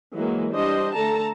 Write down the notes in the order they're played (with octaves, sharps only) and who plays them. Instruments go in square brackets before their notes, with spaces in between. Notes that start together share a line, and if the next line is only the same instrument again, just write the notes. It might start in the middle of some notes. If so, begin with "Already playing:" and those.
[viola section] E3 F#3 G#3 A#3
G3 D4 C5 D#5
D3 A3 A4 A5 A#5